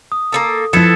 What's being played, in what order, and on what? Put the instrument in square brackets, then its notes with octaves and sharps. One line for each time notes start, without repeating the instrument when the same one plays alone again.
[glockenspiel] D#6
[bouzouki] A#3 B3 A4
[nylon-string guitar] F3 E4 [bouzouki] B3 A4 [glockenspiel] G#6 C#7 E7